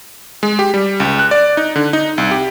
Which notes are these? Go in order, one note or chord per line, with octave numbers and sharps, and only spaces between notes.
G#3
G4
G3
C#2
F#6
D5
D#4
D3
D#4
C2
G4